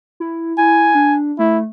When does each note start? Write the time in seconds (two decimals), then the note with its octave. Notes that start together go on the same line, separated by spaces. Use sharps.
0.20 E4
0.58 E4 G#5
0.95 D4
1.39 A3 E4